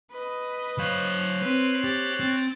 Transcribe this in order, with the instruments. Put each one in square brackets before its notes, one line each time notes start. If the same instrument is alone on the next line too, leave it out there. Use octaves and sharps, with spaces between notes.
[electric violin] B4 D#5
[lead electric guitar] F#3 F5 [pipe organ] C5 C#5 F#6
[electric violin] C4 [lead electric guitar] B4
[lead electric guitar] G4 [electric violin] A6
[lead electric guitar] C4